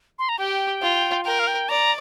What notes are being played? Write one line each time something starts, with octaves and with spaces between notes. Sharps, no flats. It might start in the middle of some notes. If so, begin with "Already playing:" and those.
C6
A#5
G4 G5
F4
A#4 G5
F5
G5
D5 A#5